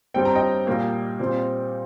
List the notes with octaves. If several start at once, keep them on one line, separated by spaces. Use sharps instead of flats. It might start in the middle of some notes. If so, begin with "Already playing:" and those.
G2 G3 C4 G5
A#5
D#5 G5
A#2 G3 A#3
A#2 G3 C4